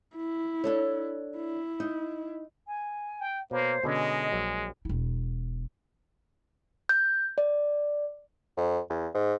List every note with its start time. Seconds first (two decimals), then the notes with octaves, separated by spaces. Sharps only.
0.16 E4
0.64 D4 A4 C#5
1.36 E4
1.80 D#4
2.69 G#5
3.20 G5
3.51 B2 A#3 C5 C#5
3.84 B2 D3 G#3 C#4 D#5
4.32 A#1 F#3
4.85 E1 E4
6.89 G6
7.38 D5
8.57 F2
8.90 E2
9.14 G#2